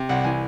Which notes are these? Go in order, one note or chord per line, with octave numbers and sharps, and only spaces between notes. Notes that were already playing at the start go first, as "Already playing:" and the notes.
Already playing: C3
C2 F#5
E3 G#5